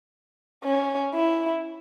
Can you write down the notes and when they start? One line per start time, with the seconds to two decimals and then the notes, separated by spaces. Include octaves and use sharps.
0.64 C#4
1.14 E4